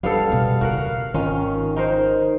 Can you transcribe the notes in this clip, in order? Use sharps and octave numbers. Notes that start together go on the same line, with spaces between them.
G3 B3 D4 F4 A4 F5
E2 B2
C#3 E3 F#4 A#4 F#5
G#1 D#3 C#4 F4
D#4 A#4 C5